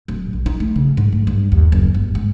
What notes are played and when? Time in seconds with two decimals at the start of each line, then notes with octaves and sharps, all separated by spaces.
0.08 D1
0.33 A#1
0.46 D#4
0.60 A3
0.76 C#3
0.97 G#2
1.12 A3
1.27 G2
1.52 D#2
1.72 F#1
1.94 G1
2.15 G#2